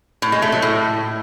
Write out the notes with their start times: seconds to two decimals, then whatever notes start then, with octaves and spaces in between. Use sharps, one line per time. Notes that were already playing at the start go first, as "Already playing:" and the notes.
0.22 A2
0.32 G#3
0.42 A3
0.52 F#3
0.62 A2